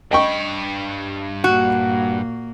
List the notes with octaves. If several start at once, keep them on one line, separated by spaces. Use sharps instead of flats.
G2 D#5 G5 B5 C#6
A#2 A#3 F#4